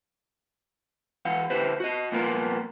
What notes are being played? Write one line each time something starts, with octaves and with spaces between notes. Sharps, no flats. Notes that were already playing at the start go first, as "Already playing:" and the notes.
E2 E3 F5 F#5
D3 E4 G4 B4 C5
F#4 D#5
C2 A#2 F3 A#3 B3 A#4